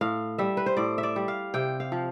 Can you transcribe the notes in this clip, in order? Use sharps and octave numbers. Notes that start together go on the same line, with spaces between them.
A2 F5
G3 E5
B4
C5
A2 D5
E5
D5
G3
F5
C3 G5
F5
F3